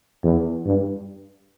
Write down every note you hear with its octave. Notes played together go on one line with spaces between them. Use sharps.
E2
G2